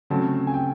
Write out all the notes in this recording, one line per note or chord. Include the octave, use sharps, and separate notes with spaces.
C#3 F#3 A3 C4 A5
G#5
G5